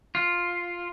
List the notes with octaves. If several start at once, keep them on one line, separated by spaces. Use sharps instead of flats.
F4